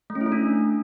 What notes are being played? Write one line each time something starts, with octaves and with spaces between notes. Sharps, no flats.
A3
C#4
E4
A3
D4